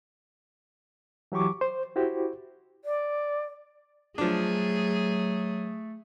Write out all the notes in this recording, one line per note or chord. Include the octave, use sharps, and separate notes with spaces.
E3 F#3 G4 C#6 D6
C5
E4 F#4 G4 C5
D5
F3 F#3 A3 D4 G#4